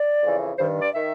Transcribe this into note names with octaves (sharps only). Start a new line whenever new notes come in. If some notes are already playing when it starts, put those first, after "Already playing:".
Already playing: D5
F2 C#3 E3
G2 D#3 C5
D5
D#3 E5